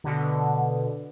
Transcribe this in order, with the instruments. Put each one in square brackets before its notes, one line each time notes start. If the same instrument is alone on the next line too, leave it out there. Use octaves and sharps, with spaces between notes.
[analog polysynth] B2 D3